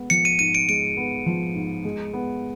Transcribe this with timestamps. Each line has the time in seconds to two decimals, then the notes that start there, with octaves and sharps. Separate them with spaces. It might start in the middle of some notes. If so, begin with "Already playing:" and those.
Already playing: G#3 B3
0.10 F3 C#7
0.25 D#7
0.39 G#2 D#7
0.55 D7
0.69 G#3 D7
0.97 B3
1.26 F3
1.55 G#2
1.85 G#3
2.14 B3